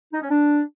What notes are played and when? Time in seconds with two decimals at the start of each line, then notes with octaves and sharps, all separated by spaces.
0.13 D#4
0.22 C#4
0.31 D4